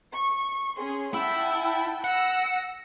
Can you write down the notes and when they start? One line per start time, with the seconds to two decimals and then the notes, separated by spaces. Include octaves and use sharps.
0.14 C#6
0.77 C#4 G#4 C6
1.14 E4 F#5 G5 A5
2.04 F#5 E6 A#6